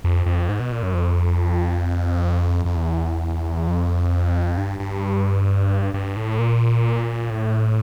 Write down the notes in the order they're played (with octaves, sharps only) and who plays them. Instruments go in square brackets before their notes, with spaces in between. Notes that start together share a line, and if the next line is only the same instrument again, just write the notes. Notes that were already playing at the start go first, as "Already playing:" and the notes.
[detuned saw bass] F2
F2
G#2
B2
A#2
F#2
F2
F2
E2
F2
G2
G2
G2
A2
A#2
A2